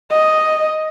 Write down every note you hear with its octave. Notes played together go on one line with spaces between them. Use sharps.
D#5